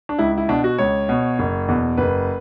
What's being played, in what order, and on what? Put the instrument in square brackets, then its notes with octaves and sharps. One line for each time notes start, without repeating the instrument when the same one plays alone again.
[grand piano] D4
C#2 E4
E4
B2 D4
F#4
C#2 C#5
B2
F#1
E2 B2
F#1 B4